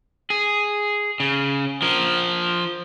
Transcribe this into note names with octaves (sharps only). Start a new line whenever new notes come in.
G#4
C#3
F3 A#4